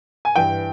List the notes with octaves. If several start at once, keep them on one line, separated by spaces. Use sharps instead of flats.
G#5
G2 E3 G5